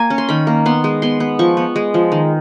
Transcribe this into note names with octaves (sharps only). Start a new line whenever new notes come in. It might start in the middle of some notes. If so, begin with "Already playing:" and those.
Already playing: A#3 G#5
C#4
C6
D#3 B5
A#3
B3 C6
G#3
B3 C6
B3
F3 C#6
B3
G#3
F3
D#3